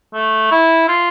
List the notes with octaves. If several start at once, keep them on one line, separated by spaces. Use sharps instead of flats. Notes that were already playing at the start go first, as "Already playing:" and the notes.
A3
E4
F4